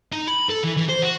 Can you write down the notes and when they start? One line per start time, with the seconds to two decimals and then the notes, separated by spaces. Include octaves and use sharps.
0.13 D#4
0.28 B5
0.50 A4
0.64 E3
0.77 E3
0.89 C5
1.02 F#4